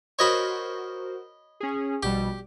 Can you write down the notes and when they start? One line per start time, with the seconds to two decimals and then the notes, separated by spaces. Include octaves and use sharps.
0.19 F#4 A#4 C5 C#5 D#5 B5
1.60 C#4 G#4
2.03 A#1 B2 G3 G4